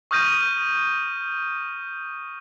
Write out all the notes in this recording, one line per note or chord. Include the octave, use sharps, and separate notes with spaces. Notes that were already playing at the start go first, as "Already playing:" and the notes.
C#6 D#6 F6 G6 A#6 D#7